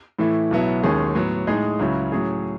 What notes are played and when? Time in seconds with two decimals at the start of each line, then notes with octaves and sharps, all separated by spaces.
0.19 A2 E3 A3 E4
0.51 B1 B2 F#3 B3 E4
0.83 D#2 D#3 G#3 C#4 G#4
1.15 A2 F#3 B3
1.47 A2 G#3 D#4 G#4
1.79 C#2 C#3 F#3 C#4 E4
2.12 A2 F#3 C#4 G#4